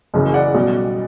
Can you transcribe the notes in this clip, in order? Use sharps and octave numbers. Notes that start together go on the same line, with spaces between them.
F#1 F#2 C#3 E3
D5 F#5
B1 B2 G3